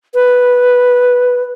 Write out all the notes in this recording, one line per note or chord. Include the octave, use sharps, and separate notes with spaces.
B4